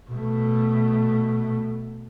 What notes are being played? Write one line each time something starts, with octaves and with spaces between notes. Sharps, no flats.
B2 A3